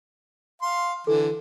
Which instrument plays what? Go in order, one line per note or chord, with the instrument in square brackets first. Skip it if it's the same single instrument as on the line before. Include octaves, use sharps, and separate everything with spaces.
[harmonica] F5 C6
[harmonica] D3 E3 [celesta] A4